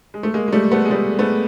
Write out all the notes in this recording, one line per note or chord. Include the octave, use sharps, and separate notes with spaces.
G#3
A3
G#3 A#3
G#3
G3 A3
A3 B3
G#3
G3 A3
A3 B3